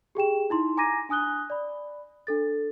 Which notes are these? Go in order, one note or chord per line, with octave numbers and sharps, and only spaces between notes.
G4 G#4 G5 E7
D#4 E4 C6
G#5 A#5 D6 G#6 A#6 D#7
D4 G#5 D#6 F#6 G7
D5 B5
D4 A4 A6